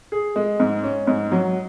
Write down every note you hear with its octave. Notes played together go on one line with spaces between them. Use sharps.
G#4
G#3
G#2
C#4
G#2
F#3